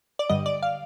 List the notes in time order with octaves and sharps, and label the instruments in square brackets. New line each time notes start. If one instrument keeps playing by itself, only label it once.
[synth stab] D5
G2 D3 G3 D#5
D5
F5